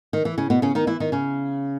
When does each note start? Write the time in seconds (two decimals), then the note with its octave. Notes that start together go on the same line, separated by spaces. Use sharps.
0.13 D#3
0.25 E3
0.38 C#3 C#4
0.50 B2 B3
0.62 C#3 C#4
0.75 D#3 D#4
0.87 E3 E4
1.00 D#3 D#4
1.12 C#3 C#4